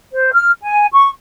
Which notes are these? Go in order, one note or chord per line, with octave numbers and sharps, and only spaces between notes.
C5
F6
G#5
C#6